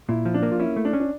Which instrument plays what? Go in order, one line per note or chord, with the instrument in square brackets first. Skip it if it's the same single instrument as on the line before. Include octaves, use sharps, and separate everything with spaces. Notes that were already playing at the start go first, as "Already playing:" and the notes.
[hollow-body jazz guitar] A#2 [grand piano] E4
[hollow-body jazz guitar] F3
[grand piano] D4
[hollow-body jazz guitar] A#3
[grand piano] F4
[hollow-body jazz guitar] C#4 [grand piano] E4
[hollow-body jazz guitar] A3
[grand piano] D4
[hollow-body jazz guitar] C#4
[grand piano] D4